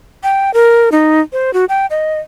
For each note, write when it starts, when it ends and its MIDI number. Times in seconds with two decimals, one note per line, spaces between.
0.23 0.53 79
0.54 0.89 70
0.92 1.20 63
1.33 1.53 72
1.53 1.65 66
1.69 1.86 79
1.90 2.19 75